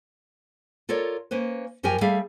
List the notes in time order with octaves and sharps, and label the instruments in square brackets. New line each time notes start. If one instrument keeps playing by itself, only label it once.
[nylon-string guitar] F4 A4 A#4 C#5 D5
A#3 C#4 B4 C5
F#2 F3 G4 A#4 G5 G#5
G3 A3 G#4 D5 F5